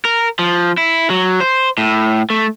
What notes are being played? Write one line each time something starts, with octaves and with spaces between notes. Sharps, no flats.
A#4
F3
E4
F#3
C5
A2
A3